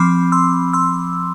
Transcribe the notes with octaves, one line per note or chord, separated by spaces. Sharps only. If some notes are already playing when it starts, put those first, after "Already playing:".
Already playing: F3 C4 B5 D6
C6 E6
C6 E6